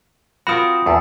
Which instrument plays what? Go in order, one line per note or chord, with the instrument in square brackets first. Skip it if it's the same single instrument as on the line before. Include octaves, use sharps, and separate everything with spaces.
[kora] C4 F4 C5 [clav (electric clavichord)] F#4 A#4 [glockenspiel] B5 D#6
[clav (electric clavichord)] E2 [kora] A4